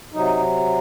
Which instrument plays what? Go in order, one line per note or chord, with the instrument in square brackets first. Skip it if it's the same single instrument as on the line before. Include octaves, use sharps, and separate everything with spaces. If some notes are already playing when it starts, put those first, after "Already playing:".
[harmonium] C3 F#3 D#4